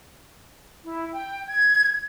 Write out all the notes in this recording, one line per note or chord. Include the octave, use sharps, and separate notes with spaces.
E4
G5
G#6